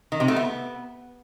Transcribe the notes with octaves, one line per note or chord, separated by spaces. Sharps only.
D#3
C3
A3
B3